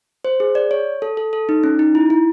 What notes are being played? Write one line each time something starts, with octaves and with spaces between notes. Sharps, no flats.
C5
G#4
D5
C#5
A4
A4
A4
D#4
C#4
D#4
E4
E4